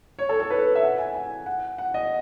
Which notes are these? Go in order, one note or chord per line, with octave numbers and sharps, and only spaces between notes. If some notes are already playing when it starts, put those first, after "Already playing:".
C#5
A4
A4
B4
E5
F#5
G#5
G#5
F#5
F#5
D#5